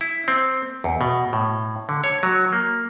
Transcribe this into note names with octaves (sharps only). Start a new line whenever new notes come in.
E4
C4
E2
B2
A2
D3
C#5
F#3
A#3